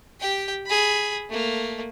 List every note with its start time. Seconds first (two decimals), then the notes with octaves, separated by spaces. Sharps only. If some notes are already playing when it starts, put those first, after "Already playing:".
0.20 G4 G5
0.67 G#4 B5
1.30 A3 A#3